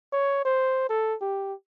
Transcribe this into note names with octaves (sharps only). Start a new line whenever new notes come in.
C#5
C5
A4
G4